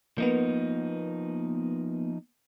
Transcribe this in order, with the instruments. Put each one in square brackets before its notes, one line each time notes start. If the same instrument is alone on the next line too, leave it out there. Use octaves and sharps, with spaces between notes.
[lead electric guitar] F3 D#4 [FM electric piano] A#3 B3